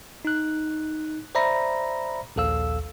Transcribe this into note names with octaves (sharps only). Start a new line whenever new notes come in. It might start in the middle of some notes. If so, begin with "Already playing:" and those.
D#4 F#6
C5 D5 E5 A#5 B5 A#6
A#1 D#2 A4 F5 E6